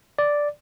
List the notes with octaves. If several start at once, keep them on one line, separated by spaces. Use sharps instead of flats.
D5